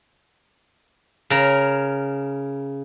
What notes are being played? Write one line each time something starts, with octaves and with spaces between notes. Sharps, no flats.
C#3 A#4